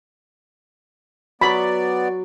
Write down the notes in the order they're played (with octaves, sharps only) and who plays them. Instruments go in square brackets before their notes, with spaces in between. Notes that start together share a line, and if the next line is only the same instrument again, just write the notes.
[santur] F#3 C#6 D6 [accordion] B3 D5 [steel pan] B5